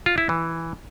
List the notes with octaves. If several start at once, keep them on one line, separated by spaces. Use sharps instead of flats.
F4
E4
E3